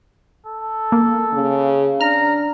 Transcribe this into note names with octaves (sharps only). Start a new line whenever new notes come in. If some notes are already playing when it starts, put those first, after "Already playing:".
A4
A#3
C#3
D4 A#5 F6